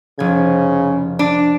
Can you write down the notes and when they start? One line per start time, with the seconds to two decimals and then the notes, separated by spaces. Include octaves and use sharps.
0.19 F1 C#3 G#6
1.19 D4